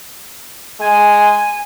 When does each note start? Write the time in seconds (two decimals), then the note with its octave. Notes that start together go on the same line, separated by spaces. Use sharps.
0.80 G#3 G#5